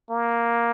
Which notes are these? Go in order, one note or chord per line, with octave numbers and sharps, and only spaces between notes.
A#3